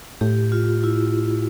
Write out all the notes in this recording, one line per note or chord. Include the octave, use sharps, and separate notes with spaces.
A2 G4
F4
E4